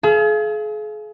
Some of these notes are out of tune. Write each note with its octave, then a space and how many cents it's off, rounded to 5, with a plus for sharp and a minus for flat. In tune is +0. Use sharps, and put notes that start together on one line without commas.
G#4 +40 F5 -30